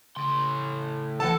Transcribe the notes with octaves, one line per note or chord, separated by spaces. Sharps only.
A2 C#3 C6
G1 E3 A4 F#5 A5